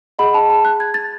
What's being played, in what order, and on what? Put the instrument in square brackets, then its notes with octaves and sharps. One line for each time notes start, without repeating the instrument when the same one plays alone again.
[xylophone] G#4 D#5 F#5 B5
A5
A5
F#6
G#6
A6